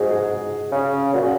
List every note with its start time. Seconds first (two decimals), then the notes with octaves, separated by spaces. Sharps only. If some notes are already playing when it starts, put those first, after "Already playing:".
Already playing: G#2 F#4 G#4
0.10 G#4
0.72 C#3
1.13 A#2 F#4
1.22 C#3